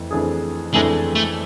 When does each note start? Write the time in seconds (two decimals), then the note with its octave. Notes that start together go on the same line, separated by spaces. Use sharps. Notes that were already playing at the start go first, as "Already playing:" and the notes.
Already playing: F2 E3 A3
0.11 F2 E3 A3 D4 G#4
0.73 F2 E3 G#3 A3 D4 G#4
1.15 A3